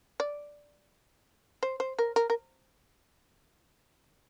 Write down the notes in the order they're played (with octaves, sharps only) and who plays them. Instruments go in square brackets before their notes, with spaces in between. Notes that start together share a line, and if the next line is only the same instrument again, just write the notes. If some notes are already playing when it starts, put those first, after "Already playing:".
[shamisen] D5
C5
C5
A#4
A#4
A#4